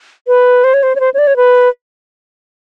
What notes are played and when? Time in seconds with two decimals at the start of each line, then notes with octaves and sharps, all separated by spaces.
0.27 B4
0.64 C5
0.74 C#5
0.83 C5
0.95 C#5
1.00 C5
1.14 C#5
1.18 D5
1.27 C#5
1.37 B4